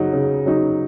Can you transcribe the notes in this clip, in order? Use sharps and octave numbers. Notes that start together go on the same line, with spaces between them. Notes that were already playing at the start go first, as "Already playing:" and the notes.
Already playing: C#3 F#3 D#4 F#5
C#3
F#3 D#4